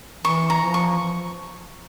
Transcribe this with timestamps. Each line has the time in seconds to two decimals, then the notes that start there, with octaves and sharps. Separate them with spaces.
0.25 E3 C#6
0.50 A#5
0.62 F3
0.74 C#6